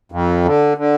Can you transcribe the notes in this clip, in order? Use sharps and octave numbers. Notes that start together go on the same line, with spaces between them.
F2
D3
D3